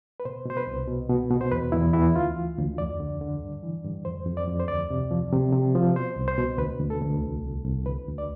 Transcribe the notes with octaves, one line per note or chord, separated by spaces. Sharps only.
B4
B2 C5
B2 C5
B4
C2
B2
B2
B2
C5
E2 B4
E2 E4
E2 E4
D2 F4
E3
D2
F2 D5
D3
D3
G2
E3
G2
F2 C5
F2
D5
F2
C5
D2 D5
C3
F3
C3
C3
F3
B2 C5
C2
C5
B2
D2 B4
D2
A4
D2
C2
C2
C2
D2 B4
D2
D5